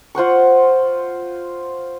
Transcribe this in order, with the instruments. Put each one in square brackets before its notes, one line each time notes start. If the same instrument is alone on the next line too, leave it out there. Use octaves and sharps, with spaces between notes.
[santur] F4 C5 F#5 C#6